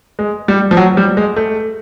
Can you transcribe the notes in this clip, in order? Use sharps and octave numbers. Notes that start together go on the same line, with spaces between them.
G#3
G3
F3
F#3
G3
G#3
A3